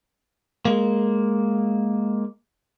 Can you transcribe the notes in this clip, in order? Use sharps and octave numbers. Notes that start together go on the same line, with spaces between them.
G#3 A#3